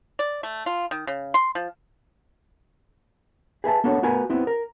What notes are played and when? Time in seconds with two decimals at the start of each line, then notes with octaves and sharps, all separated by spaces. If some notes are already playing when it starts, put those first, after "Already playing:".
0.19 D5
0.43 A3
0.66 F4
0.91 D#3
1.07 C#3
1.34 C6
1.55 F3
3.64 G#4 B4 E5 A5
3.84 A#3 B3 D4 F#4 A4 C#5
4.03 A3 B3 F#4 A#4 B4 G#5
4.30 B3 C4 E4
4.47 A#4